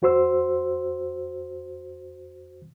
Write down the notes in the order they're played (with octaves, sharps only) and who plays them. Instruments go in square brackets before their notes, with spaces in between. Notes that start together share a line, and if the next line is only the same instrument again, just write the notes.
[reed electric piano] F2 F#4 C5 C6 E6